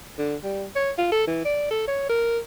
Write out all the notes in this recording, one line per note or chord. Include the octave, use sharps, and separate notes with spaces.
D3
G3
C#5
F4
A4
E3
D5
A4
C#5
A#4